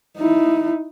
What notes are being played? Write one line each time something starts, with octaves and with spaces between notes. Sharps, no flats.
D#4 E4